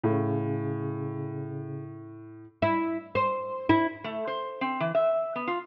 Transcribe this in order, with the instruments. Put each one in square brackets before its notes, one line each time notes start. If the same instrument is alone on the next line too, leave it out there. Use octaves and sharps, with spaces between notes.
[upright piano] A2 [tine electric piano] C#3
[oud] E4
C5
E4
[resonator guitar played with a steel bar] A3
C5
C4
E3
E5
B3
F4